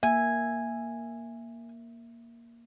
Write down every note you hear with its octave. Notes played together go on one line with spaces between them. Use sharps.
A#3 E5 G#5